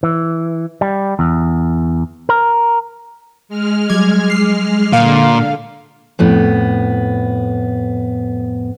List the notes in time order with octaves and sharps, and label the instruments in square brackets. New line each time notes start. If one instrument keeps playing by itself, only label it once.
[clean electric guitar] E3
G3
E2
A#4
[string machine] G#3 F6
[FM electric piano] F#3 G3 D6 [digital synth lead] G#6
[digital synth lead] C7
[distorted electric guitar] A#2 [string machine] D3 [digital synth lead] F5
[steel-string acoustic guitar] F2 A2 B3